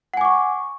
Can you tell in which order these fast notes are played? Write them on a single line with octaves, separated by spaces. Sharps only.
F#5 G#5 D6 C#6